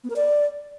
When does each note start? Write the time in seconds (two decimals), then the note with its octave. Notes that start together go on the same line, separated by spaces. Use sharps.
0.04 B3
0.10 A#4
0.16 D5